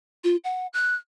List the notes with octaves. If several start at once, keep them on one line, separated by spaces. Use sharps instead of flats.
F4
F#5
F#6